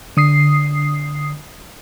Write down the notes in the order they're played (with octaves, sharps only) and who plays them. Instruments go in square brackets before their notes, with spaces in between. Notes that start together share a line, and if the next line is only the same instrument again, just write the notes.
[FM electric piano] D3 D#6 C7